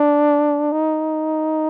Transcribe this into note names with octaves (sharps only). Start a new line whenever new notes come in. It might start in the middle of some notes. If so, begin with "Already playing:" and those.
Already playing: D4
D#4